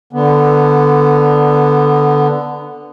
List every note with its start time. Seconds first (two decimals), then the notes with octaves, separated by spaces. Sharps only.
0.13 D3 B3